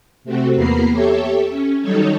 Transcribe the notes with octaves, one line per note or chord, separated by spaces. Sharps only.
C3 A3 C4 F#4
E2 A#3 B3 A#5 B5 C7
G4 A4 C#5 E5
C#4
D#3 F#3 G3 D#4 A4 C#5